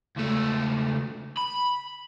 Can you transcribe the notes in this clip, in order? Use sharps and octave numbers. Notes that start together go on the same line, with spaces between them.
C#2 A3
B5